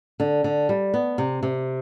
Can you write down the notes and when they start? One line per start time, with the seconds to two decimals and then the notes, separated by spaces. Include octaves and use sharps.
0.20 D3
0.44 D3
0.69 G3
0.94 B3
1.18 C3
1.43 C3